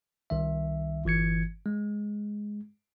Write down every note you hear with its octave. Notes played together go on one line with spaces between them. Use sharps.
C2 D#3 E5
G1 E3 G#6 C#7
G#3